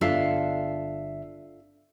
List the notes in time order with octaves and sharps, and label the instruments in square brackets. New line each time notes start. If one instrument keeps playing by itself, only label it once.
[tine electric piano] G1 E5 C7 [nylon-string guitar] D4 F4 A4